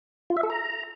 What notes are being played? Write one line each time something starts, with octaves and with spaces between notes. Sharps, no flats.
F4
E5
A4
A#5